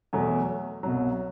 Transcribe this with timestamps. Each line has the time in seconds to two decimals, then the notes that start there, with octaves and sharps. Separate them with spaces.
0.13 E2 B2 F#3 A3
0.83 C2 B2 F#3